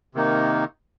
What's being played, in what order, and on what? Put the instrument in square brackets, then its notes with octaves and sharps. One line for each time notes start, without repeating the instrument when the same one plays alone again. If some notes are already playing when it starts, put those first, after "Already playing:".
[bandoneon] C3 D#3 A#3 D#4